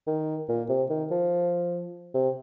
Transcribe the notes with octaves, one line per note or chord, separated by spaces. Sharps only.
D#3
A#2
C3
D#3
F3
C3